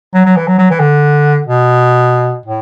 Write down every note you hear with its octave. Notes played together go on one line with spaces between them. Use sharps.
F#3
F#3
E3
F#3
F#3
E3
D3
B2
A2